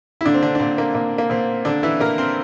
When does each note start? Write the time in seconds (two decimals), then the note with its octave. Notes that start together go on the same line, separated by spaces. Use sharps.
0.21 E4
0.25 A#2 D3 D4
0.34 C4
0.42 D3 D4
0.55 D4
0.59 A#2 C4
0.78 A#3
0.95 A#2 A#3
1.18 A#3
1.30 A#2 C4
1.65 A#2 D3 D4
1.83 E3 E4
2.00 A#2 A#3 A#4
2.18 C4 C5